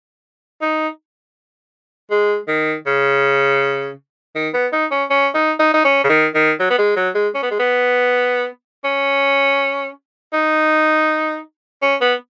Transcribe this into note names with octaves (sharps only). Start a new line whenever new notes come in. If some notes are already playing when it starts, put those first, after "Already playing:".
D#4
G#3
D#3
C#3
D#3
B3
D#4
C#4
C#4
D#4
D#4
D#4
C#4
C#3
D#3
D#3
F#3
B3
G#3
F#3
G#3
C#4
B3
G#3
B3
C#4
D#4
C#4
B3